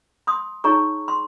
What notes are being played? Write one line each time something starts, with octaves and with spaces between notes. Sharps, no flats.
C6 D#6
D#4 G#4 C#5 A#5 C#6
C6